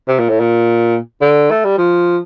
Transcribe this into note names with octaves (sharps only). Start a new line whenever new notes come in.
C3
A#2
A2
A#2
D3
A3
G3
F3